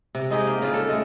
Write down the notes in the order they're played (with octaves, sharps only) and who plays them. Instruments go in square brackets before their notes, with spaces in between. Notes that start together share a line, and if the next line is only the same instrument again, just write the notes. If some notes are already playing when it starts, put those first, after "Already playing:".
[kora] C3
G#3 D#4 G4 G#4
A#3
C#3 F4
A4
G#3 A3